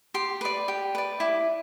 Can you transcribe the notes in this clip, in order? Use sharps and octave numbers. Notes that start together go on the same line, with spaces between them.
G4 C6
B4 D5
G4
B4 D5
E4 D6